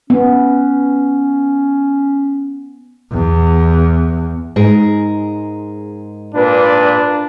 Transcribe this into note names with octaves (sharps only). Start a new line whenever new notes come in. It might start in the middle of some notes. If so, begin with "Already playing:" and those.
B3 C#4
E2
G#2 G#4 A#4
A#2 D4 B4